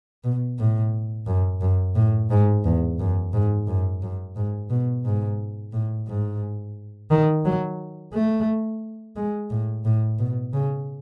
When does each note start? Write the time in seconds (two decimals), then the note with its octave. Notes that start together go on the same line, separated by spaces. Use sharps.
0.24 B2
0.59 A2
1.27 F#2
1.61 F#2
1.95 A2
2.30 G#2
2.64 E2
2.99 F#2
3.33 G#2
3.67 F#2
4.02 F#2
4.36 G#2
4.70 B2
5.05 G#2
5.73 A2
6.08 G#2
7.10 D#3
7.45 F#3
8.13 A3
9.16 G#3
9.50 A2
9.85 A2
10.19 B2
10.53 C#3